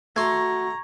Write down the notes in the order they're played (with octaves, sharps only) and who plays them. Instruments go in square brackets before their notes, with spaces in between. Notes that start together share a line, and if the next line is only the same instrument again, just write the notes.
[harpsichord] A3 C6 [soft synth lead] F#4 [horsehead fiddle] A#5 [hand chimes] C#6 G#6